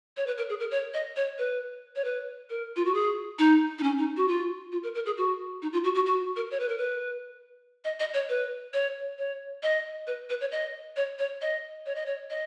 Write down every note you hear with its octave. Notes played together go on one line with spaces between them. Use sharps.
C#5
B4
A#4
G#4
A#4
C#5
D#5
C#5
B4
C#5
B4
A#4
F4
F#4
G#4
D#4
D#4
C#4
D#4
F#4
F4
F4
A#4
A#4
G#4
F#4
D#4
F4
F#4
F#4
F#4
A#4
C#5
B4
A#4
B4
D#5
D#5
C#5
B4
C#5
C#5
D#5
B4
B4
C#5
D#5
C#5
C#5
D#5
C#5
D#5
C#5
D#5